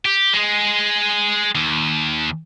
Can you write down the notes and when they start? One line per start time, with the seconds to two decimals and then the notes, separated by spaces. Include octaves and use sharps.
0.05 G4
0.33 G#3 G#4
1.55 D#2